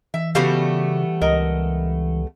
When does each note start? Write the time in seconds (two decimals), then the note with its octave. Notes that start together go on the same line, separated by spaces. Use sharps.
0.14 E3 E5
0.35 C#3 G3 A3 B3 F#4 G4 F5
1.21 C#2 A#4 D#5